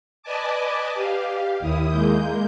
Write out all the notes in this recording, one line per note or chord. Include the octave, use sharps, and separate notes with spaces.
B4 D5 D#5 G#5 A5 D6
G4 F5
D#2 E4 D#6
G#3 A#3 G6